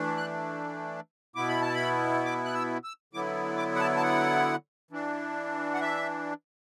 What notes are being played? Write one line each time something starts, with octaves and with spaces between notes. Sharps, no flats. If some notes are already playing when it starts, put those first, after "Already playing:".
Already playing: E3 A3 D4
F#6
B2 B3 E4 D6
B5
A5
B5
D6
F#6
E6
E6
D3 F#3 B3 E4 D6
D6
F#5
A5
A5
F#5
E3 D4
F#5
E5